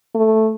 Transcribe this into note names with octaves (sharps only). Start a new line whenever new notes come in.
A3